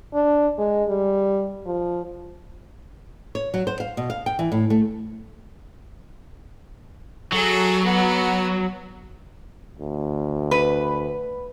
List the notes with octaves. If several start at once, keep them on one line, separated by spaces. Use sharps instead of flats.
D4
G#3
G3
F3
C#5
F#3
C5
F5
B2
F5
G5
E3
A2
A3
F#3 G#4 A4
B3 F#4
D2
B4